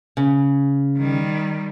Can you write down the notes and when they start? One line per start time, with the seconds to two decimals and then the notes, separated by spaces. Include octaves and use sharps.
0.17 C#3
0.98 D#3 G3